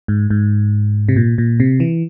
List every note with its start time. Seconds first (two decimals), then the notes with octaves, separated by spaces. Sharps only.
0.08 G#2
0.30 G#2
1.09 C3
1.16 A#2
1.38 A#2
1.60 C3
1.80 E3